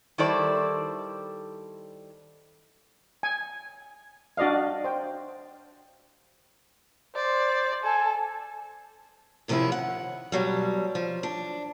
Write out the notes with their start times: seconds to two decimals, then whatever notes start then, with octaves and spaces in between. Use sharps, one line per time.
0.18 D#3 G3 E4 A4 C5 D5
3.23 G#5
4.37 D4 F#4 D5 D#5 F5
4.84 C5 G5
7.16 C5 D5
7.84 A4 G#5
9.48 F#2 C3 D#3 F3 C#4 E4
9.72 F#5
10.32 B2 F#3 G3
10.95 F3
11.23 D4